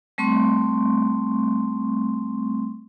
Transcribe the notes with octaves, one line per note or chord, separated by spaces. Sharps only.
G3 A3 C4 C6 C#6